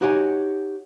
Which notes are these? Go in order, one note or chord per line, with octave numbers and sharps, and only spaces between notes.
D#4 F#4 G4 C#5 G5 G#5